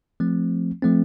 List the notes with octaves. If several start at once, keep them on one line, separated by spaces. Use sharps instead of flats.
F3 A3 C4
F3 A3 C4